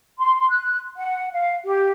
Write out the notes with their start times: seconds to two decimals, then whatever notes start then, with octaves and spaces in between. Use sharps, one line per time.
0.19 C6
0.50 F#6
0.97 F#5
1.32 F5
1.64 G4